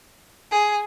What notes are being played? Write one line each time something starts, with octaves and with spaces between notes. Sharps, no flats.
G#4